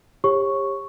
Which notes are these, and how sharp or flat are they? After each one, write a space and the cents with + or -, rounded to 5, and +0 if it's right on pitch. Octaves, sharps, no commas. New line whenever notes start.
G4 +30 C#5 -35 C#6 +0